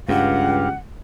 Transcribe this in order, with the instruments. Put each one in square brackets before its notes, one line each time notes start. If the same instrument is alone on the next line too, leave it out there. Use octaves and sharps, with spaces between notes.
[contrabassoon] C#2 [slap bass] G2 [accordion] G4 F5 [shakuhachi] F#5